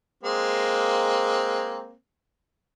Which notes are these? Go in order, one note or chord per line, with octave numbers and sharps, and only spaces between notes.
G#3 A#3 C4